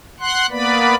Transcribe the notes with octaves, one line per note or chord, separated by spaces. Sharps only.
F#5 C6 F#6
A#3 B3 B4 D5 B5